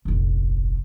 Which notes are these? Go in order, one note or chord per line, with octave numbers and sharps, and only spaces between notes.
F1 A#1